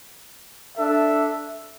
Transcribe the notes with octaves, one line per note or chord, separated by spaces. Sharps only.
D4 A4 E5